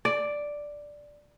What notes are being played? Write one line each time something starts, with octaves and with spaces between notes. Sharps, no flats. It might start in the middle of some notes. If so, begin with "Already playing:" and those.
D5